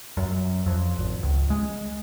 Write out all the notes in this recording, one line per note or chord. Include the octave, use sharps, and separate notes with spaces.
F#2
F2
G#1
C#2
G#3